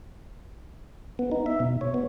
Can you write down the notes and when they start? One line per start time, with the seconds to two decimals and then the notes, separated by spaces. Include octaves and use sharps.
1.19 B3
1.32 D#4
1.46 E5
1.60 B2
1.81 C#5
1.94 B3